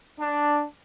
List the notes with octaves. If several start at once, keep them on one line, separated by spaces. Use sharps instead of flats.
D4